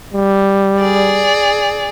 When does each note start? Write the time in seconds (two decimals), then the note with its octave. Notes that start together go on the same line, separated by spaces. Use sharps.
0.14 G3
0.80 G#4 D5